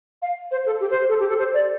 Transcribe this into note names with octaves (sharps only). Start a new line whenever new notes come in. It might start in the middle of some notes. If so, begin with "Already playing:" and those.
F5
C5
A4
G4
C5
A4
G4
A4
C5
D5